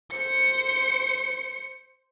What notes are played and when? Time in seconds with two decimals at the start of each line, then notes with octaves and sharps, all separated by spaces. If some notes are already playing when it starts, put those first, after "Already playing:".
0.12 C5 C#7